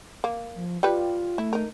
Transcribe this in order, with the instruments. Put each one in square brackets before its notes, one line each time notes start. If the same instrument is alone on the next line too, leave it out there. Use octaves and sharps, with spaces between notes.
[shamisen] A#3
[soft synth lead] F3
[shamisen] G3 G4 B4 [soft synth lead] F4
[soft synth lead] A3 [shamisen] E4
[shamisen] D#4 A#4